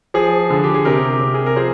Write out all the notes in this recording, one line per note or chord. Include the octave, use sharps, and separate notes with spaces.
F3 G#4
D3
G4
G#4
C3 G4 A#4
C3
G#4
A#4
F3 G#4 C5